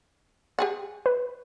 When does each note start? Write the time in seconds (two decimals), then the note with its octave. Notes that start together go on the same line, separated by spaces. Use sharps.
0.59 G4 G#4 F#5
1.06 B4